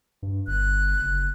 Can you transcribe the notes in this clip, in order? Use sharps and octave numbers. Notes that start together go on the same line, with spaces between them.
G2
G1 F#6
F#1